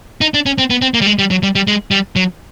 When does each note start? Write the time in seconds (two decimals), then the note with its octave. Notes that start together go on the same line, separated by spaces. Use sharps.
0.21 D#4
0.34 D4
0.46 C#4
0.58 C4
0.70 B3
0.82 C4
0.94 A#3
1.01 G3
1.07 G#3
1.19 G3
1.31 F#3
1.43 G3
1.55 G3
1.67 G#3
1.91 G3
2.16 F#3